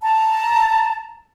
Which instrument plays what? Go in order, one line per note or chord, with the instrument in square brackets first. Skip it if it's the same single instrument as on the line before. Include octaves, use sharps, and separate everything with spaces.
[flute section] A5 A#5